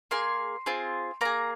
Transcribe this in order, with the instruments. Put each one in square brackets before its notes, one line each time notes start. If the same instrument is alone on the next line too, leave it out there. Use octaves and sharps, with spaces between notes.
[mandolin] A#3 G#4 C6
C4 F4 G#4
A#3 G#4 A#5